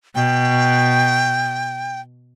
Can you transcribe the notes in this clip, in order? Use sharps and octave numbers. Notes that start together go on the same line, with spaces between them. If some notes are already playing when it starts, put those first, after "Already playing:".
B2 G5